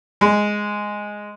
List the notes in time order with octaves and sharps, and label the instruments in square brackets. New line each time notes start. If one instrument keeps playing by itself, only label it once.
[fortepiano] G#3